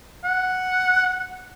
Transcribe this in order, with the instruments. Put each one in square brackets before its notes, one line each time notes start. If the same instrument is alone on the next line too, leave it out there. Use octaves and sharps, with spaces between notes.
[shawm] F#5